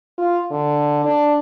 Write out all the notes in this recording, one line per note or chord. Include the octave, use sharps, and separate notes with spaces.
F4
D3
D4